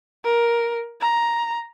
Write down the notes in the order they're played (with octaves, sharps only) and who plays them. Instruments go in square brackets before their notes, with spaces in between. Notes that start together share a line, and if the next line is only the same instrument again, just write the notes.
[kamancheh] A#4
A#5